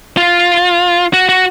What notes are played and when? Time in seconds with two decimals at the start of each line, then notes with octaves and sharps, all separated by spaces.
0.17 F4
1.13 F#4
1.29 F#4